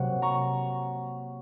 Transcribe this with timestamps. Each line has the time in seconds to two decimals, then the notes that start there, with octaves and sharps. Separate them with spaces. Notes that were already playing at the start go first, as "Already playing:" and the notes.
Already playing: C3 F#3 A#3 F#5
0.22 A#5 C#6